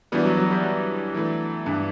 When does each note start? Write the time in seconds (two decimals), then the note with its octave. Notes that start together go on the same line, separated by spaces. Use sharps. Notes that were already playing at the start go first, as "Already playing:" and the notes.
0.12 E3 G3 B3 D4 F#4
0.25 F#3
0.37 F#3
0.51 G3
0.63 F#3
1.14 E3 A3 D4
1.66 G2